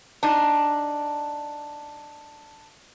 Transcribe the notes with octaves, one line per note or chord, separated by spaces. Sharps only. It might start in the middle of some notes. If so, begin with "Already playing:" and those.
D4 D#4